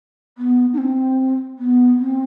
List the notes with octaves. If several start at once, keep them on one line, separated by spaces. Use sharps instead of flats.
B3
D#4
C4
B3
C4